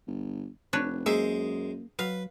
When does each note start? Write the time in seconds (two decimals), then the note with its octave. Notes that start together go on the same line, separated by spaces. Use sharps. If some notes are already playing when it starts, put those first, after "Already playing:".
0.07 G1
0.73 F1 D4 B4 C#5
1.06 F#2 G#3 A#3 C5 E5
1.99 F#3 B4 F5